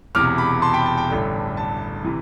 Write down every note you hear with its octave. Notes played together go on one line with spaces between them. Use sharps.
E1 E2 C3 D6 F6
B5 D6
A5 C6
G5 B5
A5
G5
A1 G2 D3 A3
A5
C3 E3